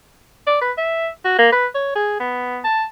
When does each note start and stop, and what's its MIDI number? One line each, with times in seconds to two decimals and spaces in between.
0.47 0.57 74
0.61 0.71 71
0.78 1.08 76
1.25 1.37 66
1.38 1.48 58
1.52 1.66 71
1.75 1.92 73
1.95 2.15 68
2.20 2.59 59
2.64 2.84 81